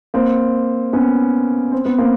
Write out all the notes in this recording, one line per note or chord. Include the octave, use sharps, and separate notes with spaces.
A#3 C4
B3 C#4
C4
B3
A#3 C4